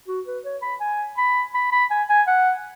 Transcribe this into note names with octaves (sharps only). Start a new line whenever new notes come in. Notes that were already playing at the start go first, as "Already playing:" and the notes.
F#4
B4
C#5
B5
G#5
B5
B5
B5
G#5
G#5
F#5